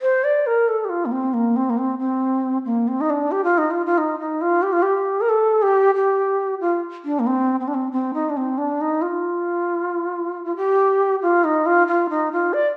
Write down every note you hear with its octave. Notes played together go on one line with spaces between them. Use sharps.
C5
D5
A#4
A4
G4
F4
A#3
C4
A#3
C4
A#3
C4
C4
A#3
C4
D#4
D4
G4
F4
D#4
F4
F4
D#4
D#4
F4
G4
F4
G4
A#4
A4
G4
G4
F4
D4
A#3
C4
C4
D4
C4
C4
D#4
D4
C4
D4
D#4
F4
F4
G4
F4
D#4
F4
F4
D#4
F4
D5